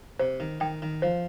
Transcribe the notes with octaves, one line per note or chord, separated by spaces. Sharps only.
C3 C5
D#3
D#3 G5
D#3
F3 C5